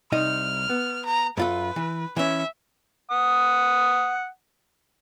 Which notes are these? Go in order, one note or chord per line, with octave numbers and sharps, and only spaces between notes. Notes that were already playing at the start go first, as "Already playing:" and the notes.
C2 D#4 D#5 F6
B3
A#5
F#2 F4 A4 B4
E3
E3 C#4 E5
F#5 D#6